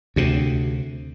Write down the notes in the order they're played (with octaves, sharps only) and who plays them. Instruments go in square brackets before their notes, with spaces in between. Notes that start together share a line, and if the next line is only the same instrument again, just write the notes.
[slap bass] D2 C3